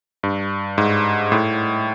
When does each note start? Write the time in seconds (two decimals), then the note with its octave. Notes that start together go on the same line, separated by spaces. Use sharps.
0.23 G2
0.78 G#2
1.32 A2